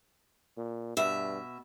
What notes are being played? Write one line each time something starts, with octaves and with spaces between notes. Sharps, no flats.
A#2
G2 B2 E5